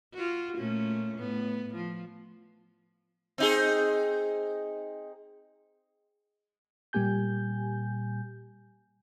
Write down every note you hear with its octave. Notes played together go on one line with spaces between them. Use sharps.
F4 F#4
A#2 A3 C#4
A2 B3
F3
C4 D#4 G#4
A#2 G3 A#3 G4 G#5 G6